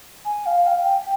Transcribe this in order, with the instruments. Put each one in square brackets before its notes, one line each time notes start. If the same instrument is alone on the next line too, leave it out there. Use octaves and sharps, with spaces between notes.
[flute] G#5
F5
G5
G5